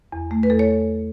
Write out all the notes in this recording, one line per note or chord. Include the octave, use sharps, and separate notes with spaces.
E2
A3
B4
E2 A4
C#5